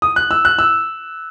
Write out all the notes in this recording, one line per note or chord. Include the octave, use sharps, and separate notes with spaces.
D#6
F#6
E6
F#6
E6